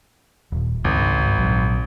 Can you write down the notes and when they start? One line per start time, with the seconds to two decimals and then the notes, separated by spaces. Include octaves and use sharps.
0.52 D#1
0.84 G#1 C#2 G2
1.38 A#1 F#3